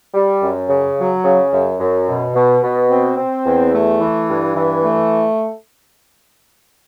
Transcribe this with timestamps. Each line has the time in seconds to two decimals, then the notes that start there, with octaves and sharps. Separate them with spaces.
0.14 G3
0.42 F#2
0.69 C#3
0.97 F#3
1.25 C#3
1.52 F#2
1.80 F#2
2.07 B2
2.35 B2
2.63 B2
2.89 C4
3.17 C4
3.46 E2
3.73 A3
4.00 E3
4.28 G2
4.56 E3
4.83 A3